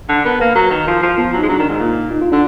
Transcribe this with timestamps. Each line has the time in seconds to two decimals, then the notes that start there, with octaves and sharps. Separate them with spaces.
0.09 D3
0.25 B3 A#4
0.40 A#3 B4
0.55 F#3 A#4
0.71 D#3
0.87 F3
1.03 F3
1.18 F3 B3
1.33 F#3 D#4
1.42 G#3
1.48 F#3 D4
1.59 D#3 D4
1.69 G#2 D#4
1.80 A#2
2.11 D#4
2.22 F4
2.32 D3 D4